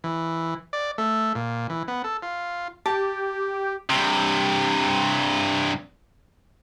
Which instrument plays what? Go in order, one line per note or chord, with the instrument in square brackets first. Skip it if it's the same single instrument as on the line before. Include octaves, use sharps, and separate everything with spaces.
[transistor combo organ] E3
D5
A3
A#2
E3
B3
A4
F4
[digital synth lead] G4 [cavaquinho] A5
[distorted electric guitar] G2 C3